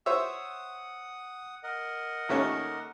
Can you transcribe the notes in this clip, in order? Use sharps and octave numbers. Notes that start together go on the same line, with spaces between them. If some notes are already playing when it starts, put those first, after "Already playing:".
C5 C#5 E5 F#5 D#6
A#4 D#5 F#5
D#2 A3 C#4